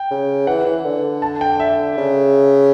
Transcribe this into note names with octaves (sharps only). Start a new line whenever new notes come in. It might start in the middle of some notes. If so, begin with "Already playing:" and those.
Already playing: G5
C#3
E3 F#5
E3
D3
A5
G5
E5
C#3